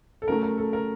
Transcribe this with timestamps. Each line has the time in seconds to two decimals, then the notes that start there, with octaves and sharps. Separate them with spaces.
0.22 A4
0.27 C#3 F#3 A3 A#4
0.43 A#4
0.58 A4
0.73 A#4